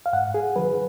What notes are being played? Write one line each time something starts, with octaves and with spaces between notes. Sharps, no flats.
F5
G#2 F#5
G#4
D#3 F#3 B4